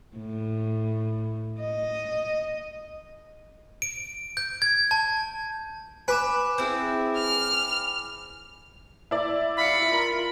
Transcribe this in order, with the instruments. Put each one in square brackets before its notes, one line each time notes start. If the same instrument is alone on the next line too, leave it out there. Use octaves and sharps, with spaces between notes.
[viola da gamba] A2
D#5
[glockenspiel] D7
G6
G#6
A5
[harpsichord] B4 [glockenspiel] G#5 D6 E7
[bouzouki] C4 E4 G#4
[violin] F6 [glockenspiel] F7
[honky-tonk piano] E4 D5
[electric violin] F5 C#7 [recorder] B5
[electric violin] F4 A#4